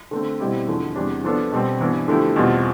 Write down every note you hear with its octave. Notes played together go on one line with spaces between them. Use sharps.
D3 A3 C4
B2 G3 C4 E4 G4
E2 D3 F3
E2 C3 G3 D4
F3 B3 D4 F4 A4
B2 G3 C4
G2 E3 B3 E4
D3 F3 A3 E4 G4
E2 B2 G3 C4 F4